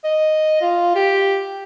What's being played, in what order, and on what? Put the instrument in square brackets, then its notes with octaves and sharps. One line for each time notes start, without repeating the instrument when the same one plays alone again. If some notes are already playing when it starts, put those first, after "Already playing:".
[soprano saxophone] D#5
F4
G4